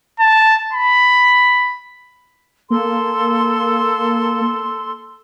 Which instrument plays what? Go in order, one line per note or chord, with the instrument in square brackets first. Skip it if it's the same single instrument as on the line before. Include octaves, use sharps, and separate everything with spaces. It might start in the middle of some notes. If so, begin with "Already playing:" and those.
[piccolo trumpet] A5
B5
[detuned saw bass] A#3 [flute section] A4 C6